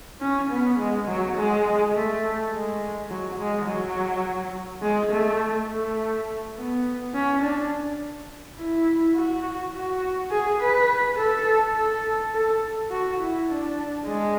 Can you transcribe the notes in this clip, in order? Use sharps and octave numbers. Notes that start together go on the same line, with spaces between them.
C#4
B3
G#3
F#3
G#3
A3
G#3
F#3
G#3
F#3
G#3
A3
A3
B3
C#4
D4
E4
F#4
F#4
G#4
B4
A4
A4
A4
F#4
E4
D4
G#3